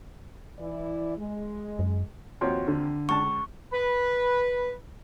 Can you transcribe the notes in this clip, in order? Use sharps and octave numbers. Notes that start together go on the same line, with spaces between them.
E3 E4 D5
G#3
F#2
D#2 F3 C4 F#4 C#5 C6
D3
C#2 A5 C#6
B4